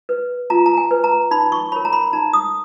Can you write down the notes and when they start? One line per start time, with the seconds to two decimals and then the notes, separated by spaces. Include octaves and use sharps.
0.09 B4
0.50 F4 A#5
0.66 A#5
0.77 G#5
0.91 B4
1.04 A#5
1.31 D#4 B5
1.52 C#6
1.72 A#4 C#5 B5
1.85 A#5
1.93 B5
2.13 D#4 A#5
2.33 D#6